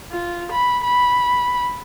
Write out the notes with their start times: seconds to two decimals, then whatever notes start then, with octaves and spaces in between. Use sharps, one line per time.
0.12 F4
0.52 B5
0.84 B5